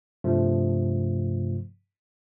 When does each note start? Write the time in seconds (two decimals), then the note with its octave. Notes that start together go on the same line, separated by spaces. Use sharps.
0.24 G2 C3 F3 A3